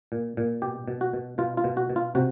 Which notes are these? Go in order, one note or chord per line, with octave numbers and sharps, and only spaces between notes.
A#2
A#2
B2 G4
B2
F#4
B2
B2 F4
F4
B2
F#4
B2
F4
C3 F#4